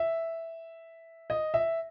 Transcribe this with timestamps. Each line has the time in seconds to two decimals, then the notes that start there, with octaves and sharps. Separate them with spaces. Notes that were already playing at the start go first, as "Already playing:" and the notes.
Already playing: E5
1.30 D#5
1.54 E5